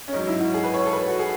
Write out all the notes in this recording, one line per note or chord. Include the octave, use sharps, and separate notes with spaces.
C#4
G#2 F#3 D#4
E4
F#4
G#4
B4
C#5
A4
B4
F#4
G#4